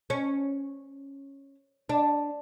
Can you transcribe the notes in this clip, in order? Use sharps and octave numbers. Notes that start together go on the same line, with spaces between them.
C#4
D4